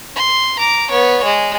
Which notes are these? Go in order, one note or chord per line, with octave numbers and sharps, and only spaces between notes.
C6
A#5 D6
B3 C#5
G#3